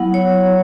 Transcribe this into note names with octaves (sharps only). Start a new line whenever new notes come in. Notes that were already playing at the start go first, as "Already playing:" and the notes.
Already playing: F#3 B3 E4 F#5
C#5